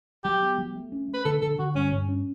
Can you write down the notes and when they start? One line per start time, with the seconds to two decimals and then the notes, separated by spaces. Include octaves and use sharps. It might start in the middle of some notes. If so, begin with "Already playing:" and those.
0.24 F#3 G4
0.42 B3
0.58 F#3
0.75 A3
0.92 C#4
1.08 A3
1.14 B4
1.25 D3 A4
1.42 D3 A4
1.59 D3 F#4
1.75 G2 C#4
1.92 G2
2.08 C#4